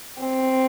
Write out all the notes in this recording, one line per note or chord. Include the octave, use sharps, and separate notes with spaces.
C4